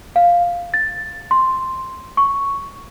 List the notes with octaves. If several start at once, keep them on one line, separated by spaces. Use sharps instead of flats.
F5
A6
C6
C#6